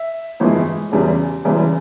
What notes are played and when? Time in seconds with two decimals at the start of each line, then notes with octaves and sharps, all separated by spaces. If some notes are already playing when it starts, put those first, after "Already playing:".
Already playing: E5
0.40 G1 F2 E3 G#3
0.92 E1 E2 C#3 E3 G3
1.45 E1 E2 C#3 E3 G3